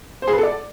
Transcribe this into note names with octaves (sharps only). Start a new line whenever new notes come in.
C5
G#4
B4
A4
D5